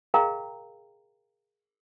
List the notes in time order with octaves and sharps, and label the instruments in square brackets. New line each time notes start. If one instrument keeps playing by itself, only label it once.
[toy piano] G#4 A#4 D#5 F5 G5 A#5